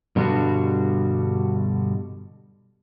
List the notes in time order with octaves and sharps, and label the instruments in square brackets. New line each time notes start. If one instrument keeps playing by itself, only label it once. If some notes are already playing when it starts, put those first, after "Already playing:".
[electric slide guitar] G2 B2 D3 G3 D4 F#4